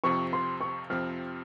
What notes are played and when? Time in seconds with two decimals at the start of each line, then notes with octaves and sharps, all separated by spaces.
0.04 F2 C3 F3 C4 C#6
0.33 C6
0.61 C#6
0.90 F2 C3 F3 C4 F6